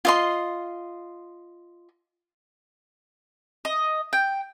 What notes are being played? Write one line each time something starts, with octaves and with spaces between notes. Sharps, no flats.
F4 D#5 C6
D#5
G5